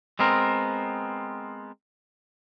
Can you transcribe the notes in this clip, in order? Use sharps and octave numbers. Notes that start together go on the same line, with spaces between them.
G#3 B3 C4 A#4